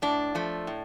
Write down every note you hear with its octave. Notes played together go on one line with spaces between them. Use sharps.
A2 D4
F3 A3
A2